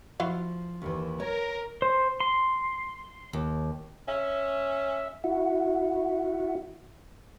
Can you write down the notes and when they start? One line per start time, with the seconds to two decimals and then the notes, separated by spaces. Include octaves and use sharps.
0.20 F3 E4 F#4 F5
0.82 D#2 D#3 E3
1.20 A#4 C#5
1.82 C5
2.20 C6
3.33 D#2
4.08 C#4 E5
5.24 E4 F#4